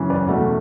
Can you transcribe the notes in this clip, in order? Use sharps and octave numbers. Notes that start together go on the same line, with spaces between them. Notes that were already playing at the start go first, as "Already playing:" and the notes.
Already playing: F#2 C#3 E3
B4 D5
E2 B2 A3